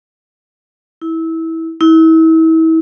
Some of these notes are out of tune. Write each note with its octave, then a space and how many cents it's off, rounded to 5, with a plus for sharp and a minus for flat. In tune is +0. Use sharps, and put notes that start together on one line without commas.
E4 -20
E4 -35